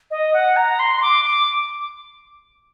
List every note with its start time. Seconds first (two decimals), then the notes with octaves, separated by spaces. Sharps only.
0.11 D#5
0.34 F#5
0.56 A#5
0.79 C6
0.97 C6
1.02 D6
1.25 D6